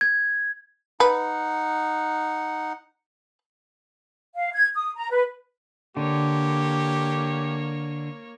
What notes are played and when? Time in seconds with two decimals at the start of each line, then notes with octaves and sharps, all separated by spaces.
0.01 G#6
1.00 D#4 B4 F#5
4.35 F5
4.53 G#6
4.75 D#6
4.95 A#5
5.11 B4
5.97 D3 A#3 G4 C#5